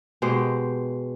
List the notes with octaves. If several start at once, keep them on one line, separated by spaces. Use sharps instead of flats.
B2 G#3 G4 C5